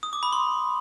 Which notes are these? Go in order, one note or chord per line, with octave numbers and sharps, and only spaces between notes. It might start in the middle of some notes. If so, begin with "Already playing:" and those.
D#6
D6
B5
C6